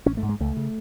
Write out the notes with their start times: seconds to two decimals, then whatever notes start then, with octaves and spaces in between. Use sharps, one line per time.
0.06 A1 C#4
0.17 A3
0.23 G#2
0.29 G#3
0.40 C#2 A3
0.57 C#3